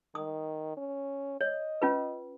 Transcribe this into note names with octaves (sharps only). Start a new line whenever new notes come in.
D#3 D#6
C#4
C#5 D#5
C#4 F4 B4